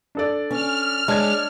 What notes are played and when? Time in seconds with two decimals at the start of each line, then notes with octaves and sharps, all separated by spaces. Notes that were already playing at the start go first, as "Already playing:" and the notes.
0.15 D4 A4 D5
0.51 C#4 F6
1.08 G#3 D4 C#5 D5 G#6